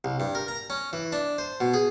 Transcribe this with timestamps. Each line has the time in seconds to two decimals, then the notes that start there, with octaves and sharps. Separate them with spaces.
0.04 C2
0.20 G2
0.35 A#4
0.48 A#5
0.70 C#4
0.93 E3
1.12 D4
1.38 C5
1.61 B2
1.74 G#4